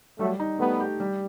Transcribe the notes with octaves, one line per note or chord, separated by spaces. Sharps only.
F#3 G3 A3
D#4
G3 A3 B3
G4
G3